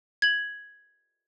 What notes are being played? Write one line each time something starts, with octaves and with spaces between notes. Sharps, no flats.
G#6 F#7